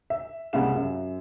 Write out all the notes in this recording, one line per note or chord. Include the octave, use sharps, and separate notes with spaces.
E5
C2 C#3 G#3 F5 F#5 E7
F#2